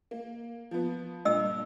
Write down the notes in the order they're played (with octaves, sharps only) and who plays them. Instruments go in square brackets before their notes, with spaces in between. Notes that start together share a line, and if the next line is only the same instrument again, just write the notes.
[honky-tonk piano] A#3
F3 B3
[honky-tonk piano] G2 A#2 [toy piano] D#5 E6